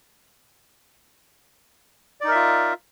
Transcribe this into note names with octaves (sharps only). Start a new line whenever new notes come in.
D#4 F4 A#4 D5 E5